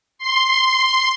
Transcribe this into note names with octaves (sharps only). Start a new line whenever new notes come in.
C6